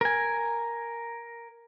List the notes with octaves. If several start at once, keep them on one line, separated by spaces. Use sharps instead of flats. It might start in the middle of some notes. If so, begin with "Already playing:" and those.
A#4 G#5